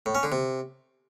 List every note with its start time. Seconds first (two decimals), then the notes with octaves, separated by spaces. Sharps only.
0.06 A2
0.15 C#4
0.23 D3
0.32 C3